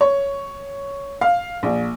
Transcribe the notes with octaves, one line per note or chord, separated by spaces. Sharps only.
C#5
F5
A#1